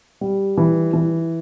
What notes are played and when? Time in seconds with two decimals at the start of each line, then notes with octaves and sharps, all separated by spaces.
0.21 G3
0.57 E3
0.93 E3